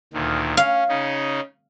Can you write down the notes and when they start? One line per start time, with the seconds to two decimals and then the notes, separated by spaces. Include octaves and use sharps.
0.13 D2 A#2 D#3
0.57 C#4 F5
0.89 C#3 C#4 D#4